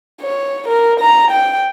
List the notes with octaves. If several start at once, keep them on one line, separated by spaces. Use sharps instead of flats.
C#5
A#4
A#5
G5